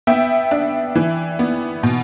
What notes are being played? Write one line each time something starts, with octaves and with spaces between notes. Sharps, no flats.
B3 E5 G5
D4
E3
B3
B2